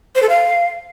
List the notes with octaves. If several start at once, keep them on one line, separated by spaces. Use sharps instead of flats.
C5
A4
F5